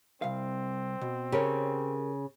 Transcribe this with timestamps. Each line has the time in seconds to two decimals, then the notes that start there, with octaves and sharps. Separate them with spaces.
0.22 C2 C4 F5
1.01 B2
1.32 C#3 G4 A#4 C#5